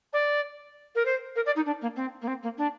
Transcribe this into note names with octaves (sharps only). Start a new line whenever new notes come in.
D5
A#4
C5
A#4
D5
D#4
D4
A#3
C4
A#3
C4
A#3
D4